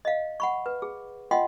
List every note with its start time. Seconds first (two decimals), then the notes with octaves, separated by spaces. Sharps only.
0.05 D#5 F5
0.40 F#5 B5 C#6
0.66 B4
0.82 G#4
1.31 F4 D#5 F#5 G5 C6